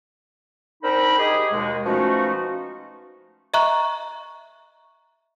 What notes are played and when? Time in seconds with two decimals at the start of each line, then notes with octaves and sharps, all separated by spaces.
0.83 C4 D4 D#4 A#4 G5 B5
1.18 D#4 G4 G#4
1.52 D#2 B2 G#3
1.85 B2 F3 A3 C#4 D#4 F#4
3.54 D#5 E5 A#5 C#6 F#6